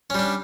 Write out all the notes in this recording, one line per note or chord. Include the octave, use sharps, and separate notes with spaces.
G3 C#4 D4